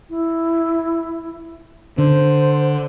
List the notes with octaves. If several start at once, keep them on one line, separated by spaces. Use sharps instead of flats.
E4
D3 C5